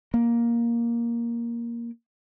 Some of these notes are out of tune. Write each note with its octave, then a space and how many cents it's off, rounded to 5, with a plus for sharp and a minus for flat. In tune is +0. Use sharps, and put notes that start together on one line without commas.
A#3 +10